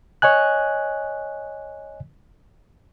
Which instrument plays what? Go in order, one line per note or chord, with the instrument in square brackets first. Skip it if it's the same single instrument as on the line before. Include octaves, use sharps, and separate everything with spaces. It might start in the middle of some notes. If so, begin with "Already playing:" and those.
[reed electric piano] C#5 D#5 G#5 F#6